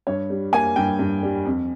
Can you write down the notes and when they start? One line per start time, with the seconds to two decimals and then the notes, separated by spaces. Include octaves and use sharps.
0.07 G2 C#5
0.30 G3
0.53 A#3 G#5
0.76 G2 G5
0.99 G2
1.23 G3
1.46 F2